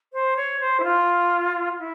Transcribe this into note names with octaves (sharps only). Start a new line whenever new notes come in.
C5
C#5
C5
E4
F4
E4